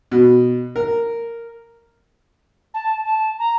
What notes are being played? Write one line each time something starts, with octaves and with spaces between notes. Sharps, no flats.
B2
A#4
A5
A5
A#5